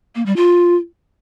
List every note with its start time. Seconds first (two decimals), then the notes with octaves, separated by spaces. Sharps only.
0.15 A#3
0.26 G3
0.36 F4